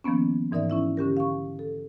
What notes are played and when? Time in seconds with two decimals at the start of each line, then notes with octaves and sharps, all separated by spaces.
0.04 D#3 F3 A#3 B3 C#4
0.51 G#2 E3 D#4 A#4 D5 E5
0.70 C#4 E4 E5
0.97 D3 C#4 G4 A#4
1.17 F5 C#6
1.59 A4